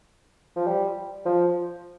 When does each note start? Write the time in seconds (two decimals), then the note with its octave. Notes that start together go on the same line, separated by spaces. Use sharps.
0.56 F3
0.67 G3
1.25 F3